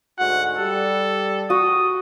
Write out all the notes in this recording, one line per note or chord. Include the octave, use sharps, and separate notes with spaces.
D2 G#2 F#4 F#5
G3 G4 A4
F#4 D#6